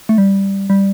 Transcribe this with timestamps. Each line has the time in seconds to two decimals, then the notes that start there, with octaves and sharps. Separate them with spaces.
0.09 A3
0.18 G3
0.70 G3